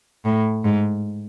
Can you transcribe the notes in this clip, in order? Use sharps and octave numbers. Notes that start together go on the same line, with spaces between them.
A2
G#2